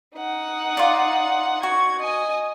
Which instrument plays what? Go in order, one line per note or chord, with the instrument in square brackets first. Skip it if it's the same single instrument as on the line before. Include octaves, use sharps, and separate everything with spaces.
[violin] D#4 F#5
[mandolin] F4 D5
[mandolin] F#4 [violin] G#6
[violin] D#5 G#5